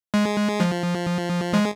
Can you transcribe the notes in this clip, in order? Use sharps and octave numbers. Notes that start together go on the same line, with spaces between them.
G#3
F3
G#3